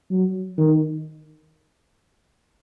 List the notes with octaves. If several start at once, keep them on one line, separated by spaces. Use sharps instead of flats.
F#3
D#3